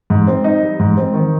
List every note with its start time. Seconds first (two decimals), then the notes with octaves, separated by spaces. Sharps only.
0.10 G#2
0.27 C4
0.44 D#4
0.62 G3
0.79 G#2
0.97 C4
1.13 D#3